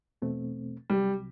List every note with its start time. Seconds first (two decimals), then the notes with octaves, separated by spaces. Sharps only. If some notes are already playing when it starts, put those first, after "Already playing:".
0.22 E2 B2 A3 C4
0.90 C2 C3 F#3 G3